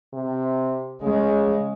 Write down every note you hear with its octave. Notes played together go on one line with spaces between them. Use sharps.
C3
C#3 G#3